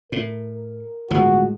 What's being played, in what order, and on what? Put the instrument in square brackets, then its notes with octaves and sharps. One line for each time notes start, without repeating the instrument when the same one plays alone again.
[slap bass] A2 [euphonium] A#4
[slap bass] G1 F3 [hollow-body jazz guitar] A2 G#3 [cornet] F#4